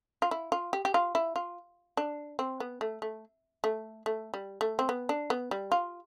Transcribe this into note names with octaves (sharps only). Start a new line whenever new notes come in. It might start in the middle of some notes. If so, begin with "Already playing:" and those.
F4
E4
F4
G4
G4
F4
E4
F4
D4
C4
B3
A3
A3
A3
A3
G3
A3
C4
B3
D4
B3
G3
F4